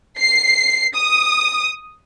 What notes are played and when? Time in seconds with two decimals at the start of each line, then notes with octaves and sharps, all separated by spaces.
0.18 C7
0.95 D#6